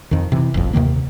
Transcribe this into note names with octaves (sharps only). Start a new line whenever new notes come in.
F2 D#3
C3 E3
F#1 B1 F2
D#2 C3 D#3 A#3